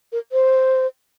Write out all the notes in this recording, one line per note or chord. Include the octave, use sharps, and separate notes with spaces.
A#4
C5